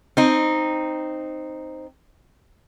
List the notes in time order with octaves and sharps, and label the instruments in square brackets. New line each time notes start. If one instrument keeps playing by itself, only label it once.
[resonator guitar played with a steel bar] C4 D#4